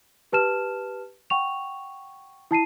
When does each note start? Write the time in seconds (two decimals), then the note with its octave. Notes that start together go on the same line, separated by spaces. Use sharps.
0.32 G4 B4 A5 F6 E7
1.30 F#5 G5 C#6 F7
2.51 E4 A5 C7 D#7